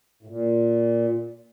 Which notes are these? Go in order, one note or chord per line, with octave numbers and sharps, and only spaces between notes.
A2
A#2